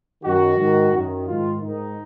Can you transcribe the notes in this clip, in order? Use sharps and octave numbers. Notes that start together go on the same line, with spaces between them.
F#2 D#3 F#4
G#2 D#3
F#2 D#3
G#2 D#3 F4
G#2 D#3 D#4